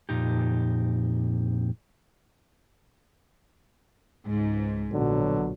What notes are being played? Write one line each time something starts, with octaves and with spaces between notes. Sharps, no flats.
F2 A#2 D#4 G4
C#2 G#2
A#1 B2 D3 F#3